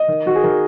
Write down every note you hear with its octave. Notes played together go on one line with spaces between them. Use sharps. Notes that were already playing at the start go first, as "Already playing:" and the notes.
Already playing: D#5
D#3
D#3 F#4
G#4
D#3 A#4